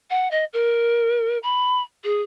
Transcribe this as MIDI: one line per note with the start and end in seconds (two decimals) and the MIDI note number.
0.10 0.28 78
0.31 0.44 75
0.53 1.38 70
1.43 1.82 83
2.04 2.21 68